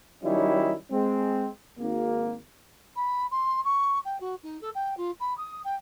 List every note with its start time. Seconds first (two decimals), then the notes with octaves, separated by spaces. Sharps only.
0.24 D#3 F#3 G3 C#4 D#4 E4
0.92 G#3 C4
1.79 G#1 A#3
2.96 B5
3.31 C6
3.65 C#6
4.05 G5
4.21 F#4
4.43 D#4
4.61 A4
4.75 G5
4.97 F4
5.20 B5
5.38 D#6
5.65 G5